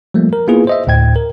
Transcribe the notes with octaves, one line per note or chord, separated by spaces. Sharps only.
F3 G3 A3 A#3
A#4
A#3 B3 E4 F4 G#4 B4
C5 D#5 E5
D2 A2 G5 G#6
A#4